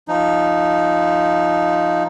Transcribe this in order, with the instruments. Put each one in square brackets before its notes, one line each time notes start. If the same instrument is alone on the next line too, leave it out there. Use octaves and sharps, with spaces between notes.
[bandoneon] F3 D#4